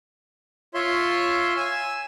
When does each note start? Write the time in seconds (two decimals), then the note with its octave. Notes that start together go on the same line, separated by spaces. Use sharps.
0.74 F4 C#5 E5 C6
1.56 G#5 E6